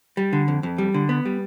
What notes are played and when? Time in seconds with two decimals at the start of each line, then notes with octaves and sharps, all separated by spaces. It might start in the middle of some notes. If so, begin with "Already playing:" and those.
0.17 G3
0.33 D3
0.48 F2
0.63 F2
0.78 G3
0.94 D3
1.09 B3
1.25 G3